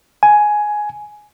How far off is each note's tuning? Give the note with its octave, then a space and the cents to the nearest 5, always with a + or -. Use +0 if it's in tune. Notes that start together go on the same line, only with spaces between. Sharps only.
G#5 +10